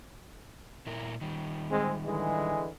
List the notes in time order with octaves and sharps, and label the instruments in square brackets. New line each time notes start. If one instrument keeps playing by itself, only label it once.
[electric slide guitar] A#2 E4 A#4
D#3 G3
[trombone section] G#3 C4
D3 E3 G#3